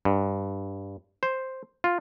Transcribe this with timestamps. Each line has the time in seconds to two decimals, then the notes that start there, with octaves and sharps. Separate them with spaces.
0.05 G2
1.23 C5
1.84 F4